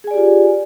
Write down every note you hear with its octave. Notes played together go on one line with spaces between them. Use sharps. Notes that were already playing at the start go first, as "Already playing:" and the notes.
F4 G4 G#4 D5 G#5